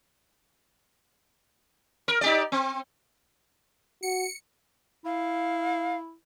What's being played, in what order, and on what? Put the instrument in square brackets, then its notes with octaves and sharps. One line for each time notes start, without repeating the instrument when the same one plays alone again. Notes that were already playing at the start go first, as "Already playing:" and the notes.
[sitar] A#4
D#4 G4 D5
C4
[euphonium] F#4 [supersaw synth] C#7
[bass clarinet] E4 [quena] F5